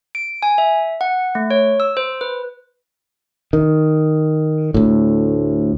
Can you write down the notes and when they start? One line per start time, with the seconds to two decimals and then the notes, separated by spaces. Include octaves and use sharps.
0.15 D7
0.43 G#5
0.58 E5
1.01 F#5
1.35 A3
1.51 C#5
1.80 E6
1.97 C5
2.21 B4
3.53 D#3
4.74 D2 A2